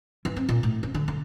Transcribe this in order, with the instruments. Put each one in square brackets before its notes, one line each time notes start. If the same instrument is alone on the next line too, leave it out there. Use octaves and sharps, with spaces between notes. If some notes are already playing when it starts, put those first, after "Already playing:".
[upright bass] E3
C4
A#2
A2
C#3
D3
D3